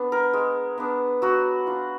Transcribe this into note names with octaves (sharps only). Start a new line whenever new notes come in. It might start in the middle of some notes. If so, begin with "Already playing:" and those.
Already playing: B3 D4
A#4
G#3
B3 D4
F#3 F#4
D4 F4